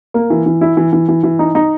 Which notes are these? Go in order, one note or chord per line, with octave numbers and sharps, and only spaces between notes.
A#3
E3
E3
E4
E3
E3
E3
E3
D#4
D#4